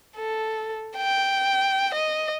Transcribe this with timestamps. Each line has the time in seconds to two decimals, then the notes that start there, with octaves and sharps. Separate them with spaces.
0.17 A4
0.97 G5
1.94 D#5